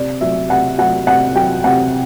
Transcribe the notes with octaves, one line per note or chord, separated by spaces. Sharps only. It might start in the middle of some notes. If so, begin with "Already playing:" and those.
Already playing: C3 D5
F#3 E5
C3 F#5
F#3 F#5
C3 F#5
F#3 G5
C3 F#5